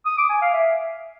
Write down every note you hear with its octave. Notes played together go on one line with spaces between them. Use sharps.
D#6
D6
G#5
F5
E5